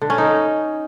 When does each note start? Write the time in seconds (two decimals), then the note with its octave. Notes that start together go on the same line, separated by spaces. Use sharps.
0.01 D3
0.10 C#4
0.18 D#4